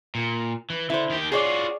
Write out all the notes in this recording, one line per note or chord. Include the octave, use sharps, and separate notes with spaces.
A#2
E3
D3 E4 C5
D#3 G4
F4 F#4 G#4 C#5 D5